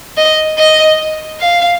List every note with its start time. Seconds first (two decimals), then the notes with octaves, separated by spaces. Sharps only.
0.17 D#5
0.59 D#5
1.40 F5